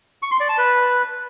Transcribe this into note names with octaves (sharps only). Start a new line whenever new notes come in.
C#6
C6
D5
A5
B4